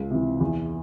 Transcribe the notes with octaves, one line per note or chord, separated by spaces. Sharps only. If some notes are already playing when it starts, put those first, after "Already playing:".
Already playing: C#2
C3 E3
E2